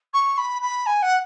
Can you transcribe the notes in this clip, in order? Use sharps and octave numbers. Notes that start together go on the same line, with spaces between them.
C#6
B5
B5
G#5
F#5